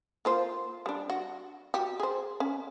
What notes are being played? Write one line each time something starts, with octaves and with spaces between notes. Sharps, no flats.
A#3 F4 C5
G3 D4
F#4
F#4 G4
G#4 C5
C#4